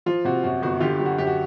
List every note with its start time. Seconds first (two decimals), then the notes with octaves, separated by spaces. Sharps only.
0.06 F3 F4
0.25 C3 F#4
0.44 F#2 F#4
0.62 G1 F#4
0.80 D3 F4 G4
0.98 F#3 G4
1.05 F#4
1.18 F#2 G4
1.27 F#4